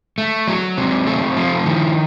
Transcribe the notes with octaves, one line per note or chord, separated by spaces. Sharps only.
A3
F#3
C3
A3
F3
D#3